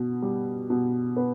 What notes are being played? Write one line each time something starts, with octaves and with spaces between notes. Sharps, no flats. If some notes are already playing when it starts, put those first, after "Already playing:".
Already playing: B2
G3
B2
B3